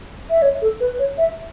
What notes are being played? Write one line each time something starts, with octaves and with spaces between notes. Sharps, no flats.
E5
C#5
A4
B4
C#5
E5